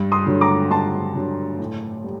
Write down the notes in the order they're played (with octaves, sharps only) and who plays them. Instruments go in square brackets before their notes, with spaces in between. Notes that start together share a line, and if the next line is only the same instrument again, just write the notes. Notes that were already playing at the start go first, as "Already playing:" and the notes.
Already playing: [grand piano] G2
[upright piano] C6 D#6
[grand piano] D3 F#3
[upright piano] A#5 D6
[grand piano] G2 [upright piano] A5 C6
[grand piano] D3 F#3
A2
G3